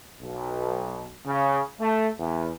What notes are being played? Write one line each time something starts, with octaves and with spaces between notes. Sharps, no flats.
B1
C#3
A3
E2